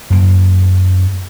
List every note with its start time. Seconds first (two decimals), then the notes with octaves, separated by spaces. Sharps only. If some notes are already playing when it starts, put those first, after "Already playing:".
0.10 F#2 A#3